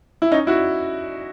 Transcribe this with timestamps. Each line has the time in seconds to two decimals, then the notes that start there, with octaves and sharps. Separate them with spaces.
0.22 E4
0.32 C#4 D#4
0.47 E4 F#4